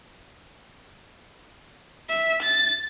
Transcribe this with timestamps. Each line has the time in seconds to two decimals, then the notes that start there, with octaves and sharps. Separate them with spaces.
2.10 E5
2.43 A6